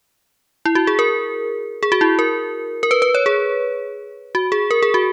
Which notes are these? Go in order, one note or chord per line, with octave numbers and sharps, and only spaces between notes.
E4
F#4
G#4
A#4
G#4
F#4
E4
A#4
A#4
B4
B4
C#5
G#4
F#4
G#4
A#4
G#4
F#4